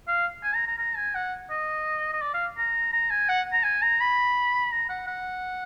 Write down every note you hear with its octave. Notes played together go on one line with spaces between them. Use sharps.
F5
G#5
A#5
A#5
A#5
G#5
F#5
D#5
D#5
D5
F5
A#5
A#5
G#5
F#5
A#5
G#5
A#5
B5
A#5
F#5
F#5